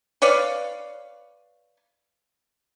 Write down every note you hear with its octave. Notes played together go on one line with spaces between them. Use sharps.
B4 C#5 D5 F5